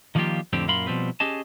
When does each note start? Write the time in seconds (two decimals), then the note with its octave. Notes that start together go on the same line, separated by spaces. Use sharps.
0.15 D#3 F3 G3 A#3 F4 G4
0.53 F2 A2 D3 C4 G4
0.68 F#2 A#2 A#4 F5 B5 C6
0.87 B2 F3 G3 C4 B4
1.20 C#4 G4 G#4 D#5 A5